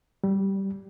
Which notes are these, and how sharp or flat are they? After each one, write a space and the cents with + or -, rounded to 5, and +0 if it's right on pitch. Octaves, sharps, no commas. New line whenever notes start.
G3 -10